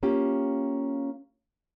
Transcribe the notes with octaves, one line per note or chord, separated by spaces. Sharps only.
A#3 C#4 F4 G4